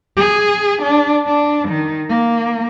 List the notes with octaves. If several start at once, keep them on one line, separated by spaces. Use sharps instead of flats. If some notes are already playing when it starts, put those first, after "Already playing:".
G#4
D4
D4
D#3
A#3